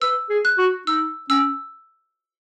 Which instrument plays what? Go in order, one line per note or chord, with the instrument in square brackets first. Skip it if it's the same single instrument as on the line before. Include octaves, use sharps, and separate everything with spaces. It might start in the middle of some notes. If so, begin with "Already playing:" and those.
[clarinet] B4 [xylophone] E6
[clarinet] G#4
[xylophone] F#6
[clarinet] F#4
[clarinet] D#4 [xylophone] E6
[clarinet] C#4 [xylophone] E6